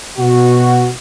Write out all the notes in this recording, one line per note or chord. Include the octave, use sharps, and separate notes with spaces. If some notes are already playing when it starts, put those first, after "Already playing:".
B2 F#4